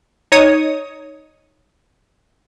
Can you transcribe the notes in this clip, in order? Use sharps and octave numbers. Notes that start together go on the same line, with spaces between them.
D#4 C#5 D#6